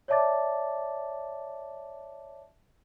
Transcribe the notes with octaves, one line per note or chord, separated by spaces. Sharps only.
C#5 D5 E5 A5 D6 A6